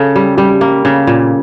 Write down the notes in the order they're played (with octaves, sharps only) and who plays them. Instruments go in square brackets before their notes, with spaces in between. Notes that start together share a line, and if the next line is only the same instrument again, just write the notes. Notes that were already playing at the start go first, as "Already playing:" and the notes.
Already playing: [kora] C#3 [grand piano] A4
[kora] G3
[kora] G3 [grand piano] G4
[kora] A#3
C#3
A#2